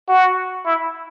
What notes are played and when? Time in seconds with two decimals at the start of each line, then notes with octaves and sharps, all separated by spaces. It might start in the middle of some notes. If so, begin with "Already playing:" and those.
0.09 F#4
0.66 E4